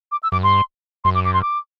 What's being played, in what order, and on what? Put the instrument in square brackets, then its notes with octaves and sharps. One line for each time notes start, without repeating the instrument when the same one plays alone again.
[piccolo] D6
E6
[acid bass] F#2 [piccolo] D6
[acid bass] G2 [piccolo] C6
[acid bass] F#2 [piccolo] C6
[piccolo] D6
D6
C6
D6